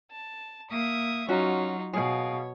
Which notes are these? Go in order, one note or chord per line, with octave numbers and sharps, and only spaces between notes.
A5
A#3 E5 D#6
F#3 C#4 D#4 F4 F#4
B2 G#4 C#5 F5